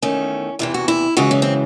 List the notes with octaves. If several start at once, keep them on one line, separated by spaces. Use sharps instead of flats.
E2 D#3 A3 C#4
E2 C3 E3 E4
F#4
E4
F#2 C#3 E3 G#3 F#4
C#4
C4